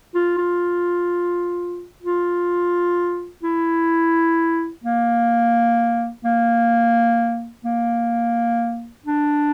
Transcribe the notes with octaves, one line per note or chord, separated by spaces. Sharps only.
F4
F4
F4
E4
A#3
A#3
A#3
D4